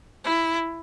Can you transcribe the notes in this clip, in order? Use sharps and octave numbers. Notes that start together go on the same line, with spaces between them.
E4